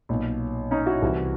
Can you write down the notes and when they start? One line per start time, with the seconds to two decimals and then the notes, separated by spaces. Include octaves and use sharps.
0.09 B1 A#2
0.71 C#4 D#4
0.86 E4 F#4
1.02 C2 C3 E3